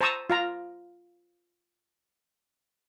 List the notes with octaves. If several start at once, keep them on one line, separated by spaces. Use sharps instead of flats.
C5 A5 A#5 C#6 D#6 E6
F4 F5 A#5